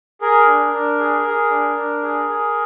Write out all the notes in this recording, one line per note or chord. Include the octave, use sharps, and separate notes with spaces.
G#4 A#4
D4
D4
G#4
G#4
D4
D4
G#4
G#4